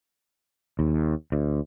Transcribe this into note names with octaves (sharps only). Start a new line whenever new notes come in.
D#2
D2